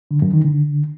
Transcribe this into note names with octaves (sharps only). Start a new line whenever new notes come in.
D3
F#2
D#3
D3